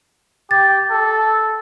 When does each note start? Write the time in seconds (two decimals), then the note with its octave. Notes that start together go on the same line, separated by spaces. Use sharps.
0.51 G4 A6
0.91 A4